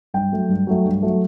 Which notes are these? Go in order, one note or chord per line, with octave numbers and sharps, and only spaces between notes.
G2 G5
F#3 A3
G2
F#3 A3
G2
F#3 A3